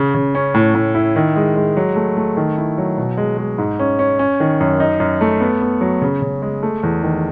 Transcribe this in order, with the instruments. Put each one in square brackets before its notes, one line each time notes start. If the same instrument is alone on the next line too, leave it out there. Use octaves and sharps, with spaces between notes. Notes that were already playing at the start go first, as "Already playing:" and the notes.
Already playing: [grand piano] C#3
C#3
C#4
A2
A2
E4
D#3
G#3
G#3
F#3
A3
A3
D#3
E4
F#3
B2
G#3
G#3
G#2
C#4
C#4
C#4
D#3
F#2
D#4
F#2
A3
B3
B3
F#3
C#3
C#3
G#3
A3
E2
D#3